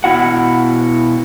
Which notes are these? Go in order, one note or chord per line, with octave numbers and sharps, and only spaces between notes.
B2 E4 F#4 F#5